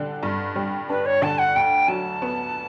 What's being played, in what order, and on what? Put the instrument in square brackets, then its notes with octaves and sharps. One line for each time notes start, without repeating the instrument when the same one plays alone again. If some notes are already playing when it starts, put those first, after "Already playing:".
Already playing: [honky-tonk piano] D3 G3 D4
G2
G3
[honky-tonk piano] D4 [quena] B4
[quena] C#5
[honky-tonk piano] D3 [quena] A5
[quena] F#5
[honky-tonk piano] D2 [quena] G5
[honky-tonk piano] F#3 [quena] A5
[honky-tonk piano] B3